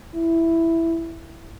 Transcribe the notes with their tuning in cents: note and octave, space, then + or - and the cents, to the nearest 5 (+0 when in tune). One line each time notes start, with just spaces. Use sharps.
E4 +5